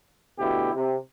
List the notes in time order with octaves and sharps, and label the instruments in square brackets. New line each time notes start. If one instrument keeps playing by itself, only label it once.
[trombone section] D2 B2 E4 G4
C3